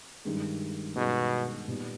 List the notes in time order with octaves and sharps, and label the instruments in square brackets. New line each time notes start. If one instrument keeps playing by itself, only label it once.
[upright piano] G2 D#3 G#3
[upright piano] G2 D#3 G#3 [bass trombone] B2
[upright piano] A#2 G3 B3 D#4